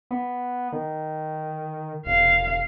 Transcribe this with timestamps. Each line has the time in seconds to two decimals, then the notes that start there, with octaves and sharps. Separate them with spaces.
0.11 B3
0.72 D#3
2.06 E1 F5